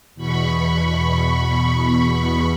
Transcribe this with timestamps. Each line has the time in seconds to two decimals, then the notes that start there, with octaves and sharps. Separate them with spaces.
0.15 E2 B2 B5 C#6